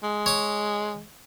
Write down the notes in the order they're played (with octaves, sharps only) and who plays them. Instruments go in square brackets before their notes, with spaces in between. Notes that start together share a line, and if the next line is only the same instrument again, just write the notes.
[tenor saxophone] G#3
[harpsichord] C#5 D6